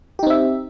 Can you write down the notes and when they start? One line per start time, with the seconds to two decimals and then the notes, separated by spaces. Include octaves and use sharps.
0.19 G4
0.23 D#4
0.27 C4
0.30 E5